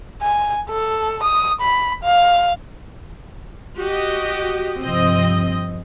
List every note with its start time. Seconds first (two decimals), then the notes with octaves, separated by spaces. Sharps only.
0.22 G#5
0.70 A4
1.23 D#6
1.61 B5
2.04 F5
3.77 F#4 G4 D#5
4.82 G2 C3 F3 C4 D#5